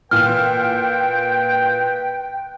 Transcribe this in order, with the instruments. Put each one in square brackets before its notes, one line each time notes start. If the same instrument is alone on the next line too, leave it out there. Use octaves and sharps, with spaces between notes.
[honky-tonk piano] A#2 E3 [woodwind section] B4 G5 [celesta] F6